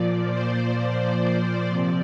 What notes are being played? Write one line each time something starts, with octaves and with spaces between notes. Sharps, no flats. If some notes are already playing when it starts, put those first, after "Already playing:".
Already playing: A#2 F3 D5
C5
C5
D5
C3 F3 D5